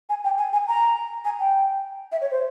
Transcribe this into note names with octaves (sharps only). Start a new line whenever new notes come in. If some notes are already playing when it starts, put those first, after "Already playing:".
G#5
G5
G#5
G#5
A#5
G#5
G5
E5
C#5
C5